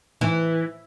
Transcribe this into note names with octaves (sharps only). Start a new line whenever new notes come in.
E3